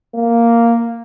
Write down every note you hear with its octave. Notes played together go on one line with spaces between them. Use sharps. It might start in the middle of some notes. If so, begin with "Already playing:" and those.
A#3